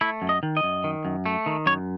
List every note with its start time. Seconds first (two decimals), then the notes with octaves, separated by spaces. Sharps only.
0.01 A3 E4
0.22 F#2
0.29 D#5
0.43 D#3
0.57 D#5
0.63 F#2
0.84 D#3
1.05 F#2
1.26 A3
1.46 D#3
1.66 F#2 C#5